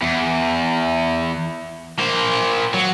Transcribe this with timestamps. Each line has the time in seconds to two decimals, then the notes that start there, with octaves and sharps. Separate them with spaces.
0.02 E2
1.99 A#3 C5
2.74 F#3